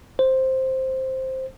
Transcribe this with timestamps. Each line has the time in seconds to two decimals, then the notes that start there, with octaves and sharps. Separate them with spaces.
0.19 C5